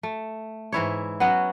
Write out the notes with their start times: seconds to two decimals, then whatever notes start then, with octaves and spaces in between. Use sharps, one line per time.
0.03 A3
0.72 G#2 E3 E4 C#5
1.20 F#3 B3 C#4 F#4